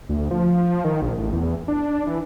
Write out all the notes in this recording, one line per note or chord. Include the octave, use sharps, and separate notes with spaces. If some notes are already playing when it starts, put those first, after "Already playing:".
D2
F3
D#3
A#1
A1
E2
D4
E3